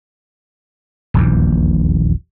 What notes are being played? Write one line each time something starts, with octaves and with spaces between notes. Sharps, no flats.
D#1 A#1 E2